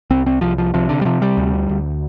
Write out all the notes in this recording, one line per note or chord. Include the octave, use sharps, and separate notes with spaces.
C2 C4
C4
C2 F3
F3
C3 F3
D3
G3
C3 F3
G3
D2
D2